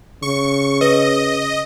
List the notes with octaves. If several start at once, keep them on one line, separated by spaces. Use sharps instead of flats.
C#3 C#6
B4 D#5